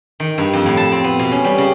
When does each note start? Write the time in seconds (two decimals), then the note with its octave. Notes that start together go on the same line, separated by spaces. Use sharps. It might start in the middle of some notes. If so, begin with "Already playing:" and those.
0.20 D#3
0.38 G2
0.53 F2
0.66 A2
0.77 A5
0.92 C4
1.04 B3
1.19 B2
1.32 C#4
1.45 G3
1.58 C#3